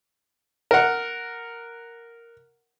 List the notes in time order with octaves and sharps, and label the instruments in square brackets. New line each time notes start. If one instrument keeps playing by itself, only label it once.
[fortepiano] A#4 F#5